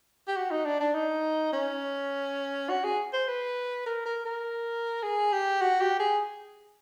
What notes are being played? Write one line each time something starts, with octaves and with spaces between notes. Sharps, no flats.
G4
F#4
D#4
D4
D4
D#4
C#4
F#4
G#4
C5
B4
A#4
A#4
A#4
G#4
G4
F#4
G4
G#4